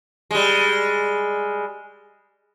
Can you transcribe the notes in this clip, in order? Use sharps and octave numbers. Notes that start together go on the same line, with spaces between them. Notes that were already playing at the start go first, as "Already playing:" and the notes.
G3 G#3